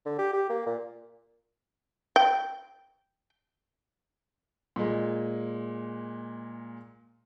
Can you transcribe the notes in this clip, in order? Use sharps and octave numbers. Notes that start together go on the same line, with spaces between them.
D3
G4
G4
A#3
A#2
G5
A#2 G#3